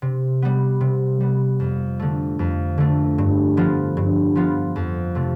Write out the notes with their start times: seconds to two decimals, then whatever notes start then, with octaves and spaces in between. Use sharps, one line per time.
0.02 C3
0.42 G3 B3
0.81 C3
1.20 G3 B3
1.60 F2
1.99 D3 A3
2.39 F2
2.78 D3 A3
3.18 G2
3.57 F3 B3 F4
3.97 G2
4.35 F3 B3 F4
4.76 F2
5.15 C3 F3 A3